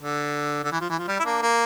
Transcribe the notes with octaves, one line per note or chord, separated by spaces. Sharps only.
D3
D3
E3
F3
E3
F3
G3
E4
A#3 D4
A#3